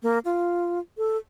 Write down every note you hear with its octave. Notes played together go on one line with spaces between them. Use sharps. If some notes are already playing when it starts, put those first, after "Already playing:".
A#3
F4
A4